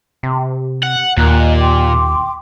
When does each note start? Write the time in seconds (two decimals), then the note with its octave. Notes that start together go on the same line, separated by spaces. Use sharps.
0.23 C3
0.83 F#5
1.17 D#2 A#2 A#4 A#5 F#6
1.37 D#5
1.57 G5 C6 D6